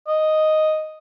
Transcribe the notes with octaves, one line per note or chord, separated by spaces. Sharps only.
D#5